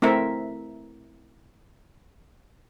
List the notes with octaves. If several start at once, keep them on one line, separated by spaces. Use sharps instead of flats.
A3 C4 E4 A#4 E5